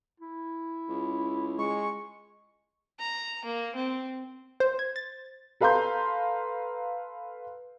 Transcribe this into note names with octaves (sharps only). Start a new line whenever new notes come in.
E4
C#2
G#3 C#6
A#5
A#3
C4
C5
G#6
A6
A4 B4 F5 A#5 C6 G6